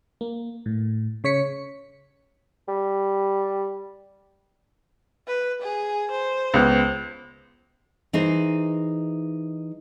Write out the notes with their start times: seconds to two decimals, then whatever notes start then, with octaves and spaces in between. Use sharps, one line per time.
0.21 A#3
0.66 A2
1.24 C#3 C#5 B6 C#7
2.68 G3
5.28 B4
5.62 G#4
6.11 C5
6.54 C#2 B3
8.13 E3 D#4 G#4 A#4 C5